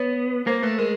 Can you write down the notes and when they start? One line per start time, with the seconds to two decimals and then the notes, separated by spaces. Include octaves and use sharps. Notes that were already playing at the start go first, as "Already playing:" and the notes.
Already playing: B3 C#5
0.47 A#3 C5
0.63 A3 B4
0.78 G#3 A#4